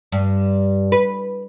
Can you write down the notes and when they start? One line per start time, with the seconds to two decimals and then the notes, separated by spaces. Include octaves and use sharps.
0.12 G2
0.92 B4